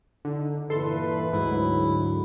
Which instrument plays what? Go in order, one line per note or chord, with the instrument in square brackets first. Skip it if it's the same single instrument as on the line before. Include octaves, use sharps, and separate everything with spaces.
[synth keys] D3 [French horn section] D#4
[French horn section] G2 A#2 E3 [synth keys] A4 C6 [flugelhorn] B4
[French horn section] D2 F#3 [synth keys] G#2 [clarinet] E4